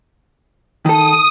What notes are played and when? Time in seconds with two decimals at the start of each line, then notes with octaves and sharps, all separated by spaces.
0.86 D#3 A4 D#6